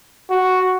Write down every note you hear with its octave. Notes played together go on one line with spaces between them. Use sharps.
F#4